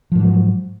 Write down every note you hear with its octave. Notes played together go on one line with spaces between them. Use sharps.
G#2 F3 F#3